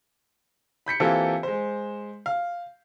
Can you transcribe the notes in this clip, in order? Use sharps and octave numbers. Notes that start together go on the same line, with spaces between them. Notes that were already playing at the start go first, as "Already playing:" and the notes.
B5 G6 B6 C#7
E3 A#3 C4 F4 G4 A4
G#3 C5
F5